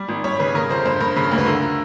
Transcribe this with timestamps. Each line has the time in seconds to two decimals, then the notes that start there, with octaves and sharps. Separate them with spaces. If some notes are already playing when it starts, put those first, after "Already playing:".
Already playing: G3 D5
0.09 G#1
0.24 G3 C#5
0.39 C#3 B4
0.55 C#3 A#4
0.70 F2 C5
0.85 G2 C5
1.01 G2 A#4
1.16 C#3
1.31 D2
1.38 B4
1.46 D3 A#4